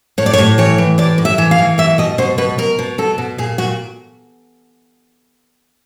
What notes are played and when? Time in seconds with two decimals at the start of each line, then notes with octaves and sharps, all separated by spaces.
0.18 A2 C#5
0.26 D5
0.33 C#5
0.38 A2
0.58 E3 C#5
0.78 E3
0.98 A2 D5
1.18 A2
1.25 E5
1.38 E3
1.51 F5
1.59 E3
1.78 B2 E5
1.98 B2 D#5
2.18 B2 C5
2.38 B2 B4
2.58 B2 A#4
2.79 B2
2.98 B2 A4
3.18 B2
3.38 A#2 G#4
3.58 A#2 F#4